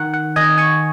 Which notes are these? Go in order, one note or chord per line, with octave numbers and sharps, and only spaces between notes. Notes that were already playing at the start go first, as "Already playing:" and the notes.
Already playing: D#3 F#5
F#5
D#3 D#5 G#5
G#5 C#6